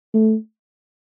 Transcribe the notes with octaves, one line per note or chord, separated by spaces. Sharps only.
A3